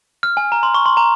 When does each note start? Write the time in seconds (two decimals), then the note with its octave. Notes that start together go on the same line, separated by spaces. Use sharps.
0.23 F6
0.37 G#5
0.52 A#5
0.63 C6
0.74 C#6
0.86 C6
0.97 A#5